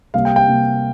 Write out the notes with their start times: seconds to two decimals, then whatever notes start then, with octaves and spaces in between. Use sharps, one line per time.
0.14 C3 G3 A#3 F5
0.25 G5
0.36 G5
0.47 C3 G3 A#3